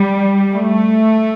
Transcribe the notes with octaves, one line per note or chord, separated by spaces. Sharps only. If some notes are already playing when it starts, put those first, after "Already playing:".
Already playing: G3
A3